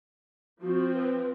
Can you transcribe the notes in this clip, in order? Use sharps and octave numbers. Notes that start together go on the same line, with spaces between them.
F3 C4 F#4
B4